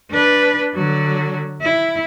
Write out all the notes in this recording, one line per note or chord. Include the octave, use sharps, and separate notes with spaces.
D4 B4
D3 F#3
E4